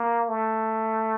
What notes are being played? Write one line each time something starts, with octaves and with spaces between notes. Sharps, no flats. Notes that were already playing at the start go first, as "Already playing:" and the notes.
Already playing: A#3
A3